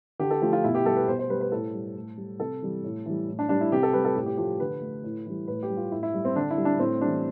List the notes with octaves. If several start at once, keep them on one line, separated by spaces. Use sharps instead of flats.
D3 G4
A4
F3 A3 G4
F4
B2 E4
G4
G3 A4
B4
B2 C5
C5
G3 B4
B4
A2 A4
G3
A2
G3
C3 A4
E3 G3
A2
E3 G3
A2
D4
G3 D4
E4
C3 G4
A4
G3 B4
A4
A2 G4
G4
F3 A3 G4
D3 B4
A3
A2
E3 G3
A2 B4
G4
G3
F4
A2 E4
E4
G3
C4
D3 D4
E4
G3
D4
A2 C4
E3 G3 D4